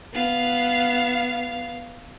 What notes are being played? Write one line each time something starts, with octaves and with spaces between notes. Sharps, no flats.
B3 F5